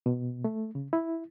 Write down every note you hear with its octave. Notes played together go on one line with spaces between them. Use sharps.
B2
A3
C#3
E4